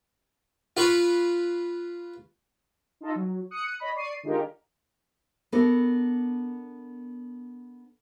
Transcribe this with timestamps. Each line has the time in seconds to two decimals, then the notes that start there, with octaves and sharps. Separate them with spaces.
0.77 F4 B4 C#6
3.01 D#4 F4 A4 D#5
3.15 F#3
3.51 D#6 F#6 C#7
3.80 C#5 D#5 B5
3.94 D5 C#6 C7 D#7
4.23 D3 G#3 D#4 F4 G4 A#4
5.52 B3 D4 A4 A#4